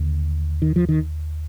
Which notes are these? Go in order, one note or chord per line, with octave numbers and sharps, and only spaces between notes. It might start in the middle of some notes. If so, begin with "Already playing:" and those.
Already playing: D#2 D3
D#3
F3
D#3